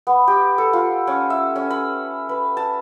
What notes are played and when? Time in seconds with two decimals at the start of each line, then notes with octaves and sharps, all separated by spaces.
0.07 B3
0.28 G4
0.58 A4
0.73 F4
1.07 C#4
1.30 E5
1.56 C#4
1.70 B5
2.29 B4
2.57 A5